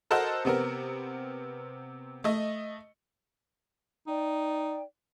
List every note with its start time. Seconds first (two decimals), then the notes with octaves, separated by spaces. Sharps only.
0.10 F#4 A4 A#4 C5 D#5 F#5
0.45 C3 B3 C4 A#4
2.24 A3 D#5
4.07 D#4 D5 G5